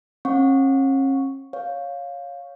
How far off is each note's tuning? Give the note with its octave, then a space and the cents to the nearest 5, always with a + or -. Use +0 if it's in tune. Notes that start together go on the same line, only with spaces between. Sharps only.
C#4 -45 F#5 -40 C#6 +0
C#5 +0 F5 +10